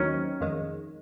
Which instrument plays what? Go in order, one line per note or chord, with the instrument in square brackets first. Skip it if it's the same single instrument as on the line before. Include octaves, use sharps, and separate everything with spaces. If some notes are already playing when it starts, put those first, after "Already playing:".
Already playing: [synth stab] D#2 D#3 F#3 C4 D#4 [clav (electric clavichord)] C#4
[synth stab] F2 D#3 G#3